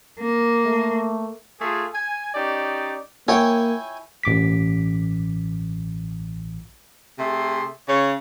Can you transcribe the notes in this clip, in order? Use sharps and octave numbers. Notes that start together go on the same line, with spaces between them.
A#3
A3
A3 F4 G#4
G#5
C#4 D#4 G4 D5
A#3 E4 C#5 G5 G#5
A1 D6 B6
C3 A3 G#4 C6
C#3 C#5